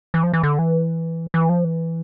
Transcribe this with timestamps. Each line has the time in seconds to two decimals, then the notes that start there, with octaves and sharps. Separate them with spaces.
0.14 E3
0.23 F3
0.33 E3
0.43 D3
0.59 E3
1.34 E3
1.49 F3
1.64 E3